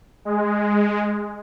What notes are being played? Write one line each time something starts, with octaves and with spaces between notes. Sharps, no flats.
G#3